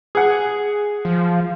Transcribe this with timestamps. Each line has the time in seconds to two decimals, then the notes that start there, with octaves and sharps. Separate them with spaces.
0.15 G#4 F#5
1.05 F3